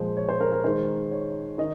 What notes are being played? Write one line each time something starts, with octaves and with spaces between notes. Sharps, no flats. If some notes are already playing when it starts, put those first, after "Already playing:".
Already playing: A#2 F3 G#3 C5
C#5
C5
A#4
A#4
D#3 G#3 C5
C#5
D#3 D#5